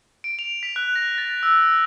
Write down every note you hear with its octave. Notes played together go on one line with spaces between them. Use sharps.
D7
F7
B6
F#6
A#6
A6
E6